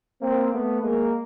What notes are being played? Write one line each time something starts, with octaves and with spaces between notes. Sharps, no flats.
A#3 C4
A3 B3
G#3 A#3